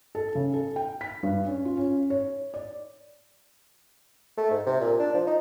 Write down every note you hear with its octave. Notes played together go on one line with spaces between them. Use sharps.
A4
C#3
A4
G5
B6
G2
C#4
F4
C#4
C#5
D5
A3
G#2
C3
A#2
D4
F3
D#4